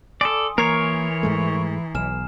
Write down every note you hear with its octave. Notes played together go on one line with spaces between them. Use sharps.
A4 D5 G#5 C6 D#6
E3 A#3 A#4 C#5 A#5 G#6 C7
G#2 G#3 A3
B1 G#5 F6 E7